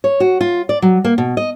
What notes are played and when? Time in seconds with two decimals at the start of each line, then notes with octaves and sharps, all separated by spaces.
0.04 C#5
0.20 F#4
0.41 F4
0.69 D5
0.82 F#3
1.04 A#3
1.18 B2
1.37 D#5